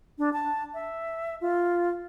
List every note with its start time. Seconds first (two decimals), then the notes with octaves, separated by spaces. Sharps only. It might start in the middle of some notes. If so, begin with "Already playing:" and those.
0.18 D4
0.33 A5
0.74 E5
1.41 F4